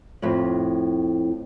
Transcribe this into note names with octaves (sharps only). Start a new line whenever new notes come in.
F2 A2